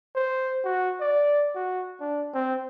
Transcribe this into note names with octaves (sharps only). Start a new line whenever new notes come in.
C5
F#4
D5
F#4
D4
C4